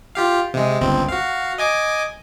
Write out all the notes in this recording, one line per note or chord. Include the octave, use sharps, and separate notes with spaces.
F4 G4 F5
C3 G#3
G1 C#2 C4
F#4 F5
D#5 G#5 D6